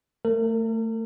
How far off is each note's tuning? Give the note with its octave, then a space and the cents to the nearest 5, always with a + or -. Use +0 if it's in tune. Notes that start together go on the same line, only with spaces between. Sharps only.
A3 +25 A#4 -40